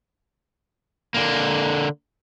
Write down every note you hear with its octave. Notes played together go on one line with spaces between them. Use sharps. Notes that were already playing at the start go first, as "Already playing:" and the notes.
D3 A#3